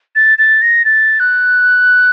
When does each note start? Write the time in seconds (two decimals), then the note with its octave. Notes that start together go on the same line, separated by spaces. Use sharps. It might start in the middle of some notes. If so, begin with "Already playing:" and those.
0.15 A6
0.38 A6
0.62 A#6
0.85 A6
1.20 F#6